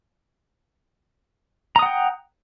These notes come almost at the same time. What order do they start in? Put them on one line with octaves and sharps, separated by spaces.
A#5 D#6 F#5 G5